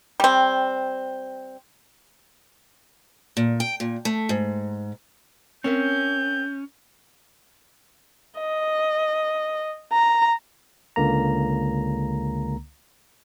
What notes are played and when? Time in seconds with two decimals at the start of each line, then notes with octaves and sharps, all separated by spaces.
0.20 G3 C4
3.37 A#2
3.60 G5
3.80 A#2
4.05 A3
4.29 G#2
5.64 C4 C#4 A#4 E5 G6
8.40 D#5
9.93 A#5
10.96 C#2 D3 A#3 A#5